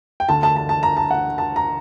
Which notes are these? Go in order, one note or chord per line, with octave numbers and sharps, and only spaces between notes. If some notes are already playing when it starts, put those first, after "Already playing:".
G5
D2 D3 A5
A5
A5
A5
A#5
A5
F#5
A5
A#5